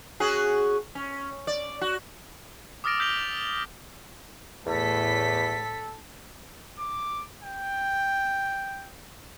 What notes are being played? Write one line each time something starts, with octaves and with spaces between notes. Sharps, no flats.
C#4 F#4 G#4
C#4
D5
F#4
D6 D#6 F6 A6 A#6 D7
D#6 E6 G6 B6 F7 G7
E2 A2 A4 B6
D6
G5